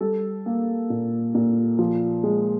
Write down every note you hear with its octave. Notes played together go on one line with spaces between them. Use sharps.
G3 A4
A#3
A#2
A#2
F3
G#3